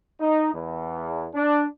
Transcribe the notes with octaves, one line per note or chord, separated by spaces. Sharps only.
D#4
E2
D4